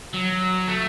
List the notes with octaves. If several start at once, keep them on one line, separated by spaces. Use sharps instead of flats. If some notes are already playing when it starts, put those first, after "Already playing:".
F#3
A3